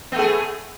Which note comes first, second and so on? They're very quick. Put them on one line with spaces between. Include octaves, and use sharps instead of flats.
B3 A3 G#4